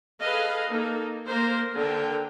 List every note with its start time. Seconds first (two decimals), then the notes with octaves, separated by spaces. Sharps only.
0.21 G#4 A4 B4 D#5 F5
0.68 A#3 D#4 A4
1.25 A#3 A#4 C5
1.74 D3 A#4 G5